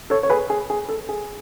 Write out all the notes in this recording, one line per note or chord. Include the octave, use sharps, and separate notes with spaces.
A4 C#5
C#5
G#4 B4
G#4
G#4
A4
G#4